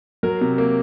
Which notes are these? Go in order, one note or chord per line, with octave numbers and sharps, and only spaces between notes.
F#3 A#4
C3
A#3